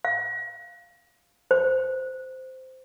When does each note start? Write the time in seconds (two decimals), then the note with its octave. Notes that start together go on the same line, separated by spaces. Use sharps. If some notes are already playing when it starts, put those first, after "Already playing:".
0.05 F5
1.51 C5